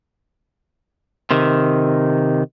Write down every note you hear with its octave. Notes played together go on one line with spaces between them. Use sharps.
C3 D#3